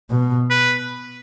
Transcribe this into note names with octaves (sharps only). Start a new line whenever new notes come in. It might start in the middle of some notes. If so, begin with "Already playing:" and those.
B2
B4